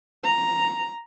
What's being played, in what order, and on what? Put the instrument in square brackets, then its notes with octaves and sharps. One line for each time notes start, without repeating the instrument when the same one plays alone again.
[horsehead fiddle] A#5